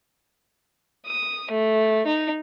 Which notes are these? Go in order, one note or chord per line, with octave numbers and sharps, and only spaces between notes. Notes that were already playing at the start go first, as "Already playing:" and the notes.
D#6
A3
D#4